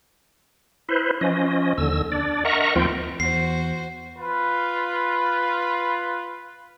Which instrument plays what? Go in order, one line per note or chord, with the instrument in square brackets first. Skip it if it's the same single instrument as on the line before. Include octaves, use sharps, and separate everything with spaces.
[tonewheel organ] E4 B4 C5
F3 C#4 D#5
D#2 D3 E6
D4 D5
A#4 D#5 E5 F#5 A#5 C#6
D#2 F3 C4 F4 G5
[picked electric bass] E2 [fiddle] F#4 C5 [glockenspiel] C7
[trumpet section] F4 B4